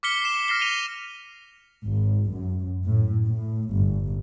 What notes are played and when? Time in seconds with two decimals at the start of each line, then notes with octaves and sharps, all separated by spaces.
0.03 D6 F6 B6 C#7 G7
0.21 C7 E7
0.48 F6 A#6 C7 G7
0.61 A#6 D#7 F7 G7
1.84 G#1
2.30 F#2
2.85 A2
3.26 A2
3.71 G1